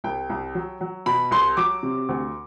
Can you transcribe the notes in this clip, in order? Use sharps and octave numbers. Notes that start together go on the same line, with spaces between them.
C2 G5
C2
F#3
F#3
B2 B5
C2 C6
F#3 D6
C3
D2